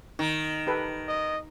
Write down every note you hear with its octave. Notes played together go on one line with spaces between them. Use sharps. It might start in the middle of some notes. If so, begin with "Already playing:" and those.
D#3 D#4
G4 A4 B4
D#5